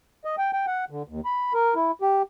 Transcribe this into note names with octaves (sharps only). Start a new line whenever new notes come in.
D#5
G5
G5
F#5
D3
D#2
B5
A#4
E4
G4